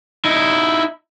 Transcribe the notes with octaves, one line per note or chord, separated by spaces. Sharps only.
D#4 E4